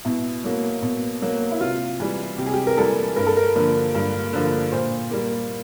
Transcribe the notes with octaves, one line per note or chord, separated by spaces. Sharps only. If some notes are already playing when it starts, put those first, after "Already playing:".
B2 E4
F#3 A#3
B2
F#3 A#3
E4
C3 F4
E3 G3
C3 G4
G#4
G4
A#4
E3 G3 A4
G2 A#4
A4
A#4
D3 F3 A#3
G2
D3 F3 A#3
A#2 C5
G3 A#3